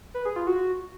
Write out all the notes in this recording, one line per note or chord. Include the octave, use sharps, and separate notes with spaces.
B4
G#4
F4
F#4